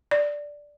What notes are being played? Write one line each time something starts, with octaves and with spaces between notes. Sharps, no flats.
D5